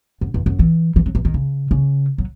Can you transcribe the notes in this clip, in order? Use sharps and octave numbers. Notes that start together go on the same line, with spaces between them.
F#2
E2
F#2
E3
E3
F#3
E3
D#3
C#3
C#3
F#3